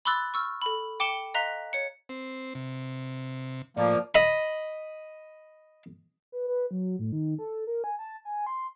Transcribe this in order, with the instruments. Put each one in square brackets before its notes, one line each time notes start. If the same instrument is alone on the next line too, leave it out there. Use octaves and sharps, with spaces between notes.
[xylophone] B5 C6 D6 E6 F#6 A6
C#6 E6 F6
A4 B5
G5 D6 C#7 E7 G7
D#5 F5 A#5 C6 F#6 B6
C#5 C#7
[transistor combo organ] C4
C3
[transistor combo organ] A2 [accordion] F3 A#3 [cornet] D5
[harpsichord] D#5 B5
[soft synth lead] B4
B4
F#3
A2
D#3
A4
A#4
G#5
A5
G#5
C6